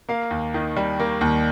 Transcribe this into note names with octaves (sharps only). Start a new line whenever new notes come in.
A#3 F5
D#2
D#3
G3
A#3
D#2